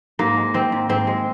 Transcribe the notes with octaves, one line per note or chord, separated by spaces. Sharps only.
G#2 A#3
G#3
D#3 C4
G#2
G#2 C4
G#3